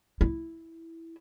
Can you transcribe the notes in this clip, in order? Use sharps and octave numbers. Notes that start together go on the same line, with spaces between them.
E4